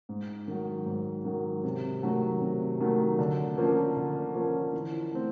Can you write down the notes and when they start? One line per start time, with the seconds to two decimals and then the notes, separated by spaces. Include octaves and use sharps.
0.09 G#2
0.48 D#3 F#3
0.86 G#2
1.25 D#3 F#3
1.64 C3
2.02 D#3 F#3 A3
2.41 C3
2.80 D#3 F#3 A3
3.19 D3
3.57 F3 A#3 C#4
3.97 D3
4.35 F3 A#3 C#4
4.73 E3
5.13 A3 C4